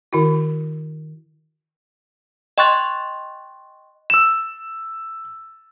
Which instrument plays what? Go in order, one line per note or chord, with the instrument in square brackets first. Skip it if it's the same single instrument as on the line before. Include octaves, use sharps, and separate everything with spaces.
[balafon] D#3 E4 F#4
[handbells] D#5 G5 C6 C#6 F#6 A6
[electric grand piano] E6 E7